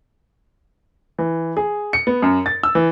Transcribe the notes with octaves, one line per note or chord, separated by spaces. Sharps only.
E3
G#4
C#7
B3
F#2
A6
E6
E3